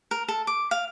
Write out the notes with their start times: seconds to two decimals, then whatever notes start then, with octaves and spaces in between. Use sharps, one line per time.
0.11 A#4
0.28 A4
0.47 D6
0.71 F5